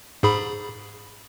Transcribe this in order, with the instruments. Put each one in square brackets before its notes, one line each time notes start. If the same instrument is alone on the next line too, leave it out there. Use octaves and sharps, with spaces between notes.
[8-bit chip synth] G#2 G#4 B5